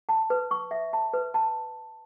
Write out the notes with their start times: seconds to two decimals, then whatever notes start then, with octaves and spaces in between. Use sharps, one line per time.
0.09 A5
0.30 B4
0.51 C#6
0.71 E5
0.93 A5
1.14 B4
1.34 A5